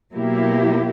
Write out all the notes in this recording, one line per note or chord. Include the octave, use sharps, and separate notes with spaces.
B2 F#3 A#3 E4 G4